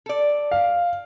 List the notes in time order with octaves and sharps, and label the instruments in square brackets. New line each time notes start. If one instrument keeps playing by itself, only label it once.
[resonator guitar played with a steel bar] A4 D5
[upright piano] F5